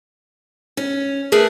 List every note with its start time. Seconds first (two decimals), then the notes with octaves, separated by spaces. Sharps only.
0.77 C#4
1.32 A3 G#4 A#4 B4